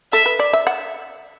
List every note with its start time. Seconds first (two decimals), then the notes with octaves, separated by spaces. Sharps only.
0.13 A4 E5
0.26 B4
0.39 D5
0.53 E5
0.67 F#5